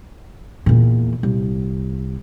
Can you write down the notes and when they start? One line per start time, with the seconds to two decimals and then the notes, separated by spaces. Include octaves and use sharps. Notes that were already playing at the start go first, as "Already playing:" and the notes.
0.66 E2 A#2
1.23 C2